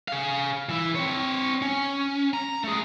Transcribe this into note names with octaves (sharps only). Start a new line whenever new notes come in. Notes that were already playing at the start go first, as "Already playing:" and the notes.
G#4 F5
E3 E4
C4 C#5
C#4
A#5
A3 G#4